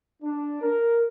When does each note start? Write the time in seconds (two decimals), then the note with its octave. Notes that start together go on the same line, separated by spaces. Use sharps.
0.22 D4
0.62 A#4